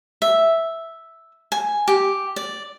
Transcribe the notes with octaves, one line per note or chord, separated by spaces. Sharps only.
E5
G#5
G4
D5